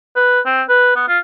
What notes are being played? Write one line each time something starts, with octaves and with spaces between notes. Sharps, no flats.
B4
C4
B4
B3
F4